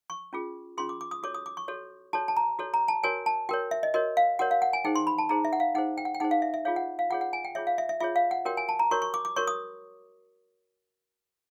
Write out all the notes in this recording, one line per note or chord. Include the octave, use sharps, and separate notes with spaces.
C#6
C#4 F4 G#4
C#4 F4 G#4 C6
D6
D6
D#6
F#4 A4 C#5 D6
D#6
D6
C#6
F#4 A4 C#5
F#4 A4 C#5 A5
A5
A#5
F#4 A4 C#5
A#5
A5
F#4 A#4 C#5 G#5
A5
F#4 A#4 C#5 G5
E5
D#5
F#4 A#4 C#5 D#5
F5
F#4 A#4 C#5 F#5
F5
F#5
G#5
D#4 G#4 C5 G5
C6
B5
A5
D#4 G#4 C5 A#5
E5
F#5
F5
D#4 G#4 C5 F#5
G5
F#5
G5
D#4 G#4 C5 F#5
F5
E5
E5
F4 G#4 C#5 F5
F#5
F5
F4 G#4 C#5 F#5
F#5
G#5
G5
F4 G#4 C#5 E5
F5
E5
E5
F4 G#4 C#5 E5
F5
F#5
F#4 A#4 C#5 G5
G#5
A5
A#5
F#4 A#4 C#5 C#6
C#6
D6
D6
F#4 A#4 C#5 C#6
D#6